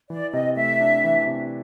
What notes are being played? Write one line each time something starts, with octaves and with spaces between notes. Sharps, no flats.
E3 D5
C3 D#5
A3 E5
D4
E3
C3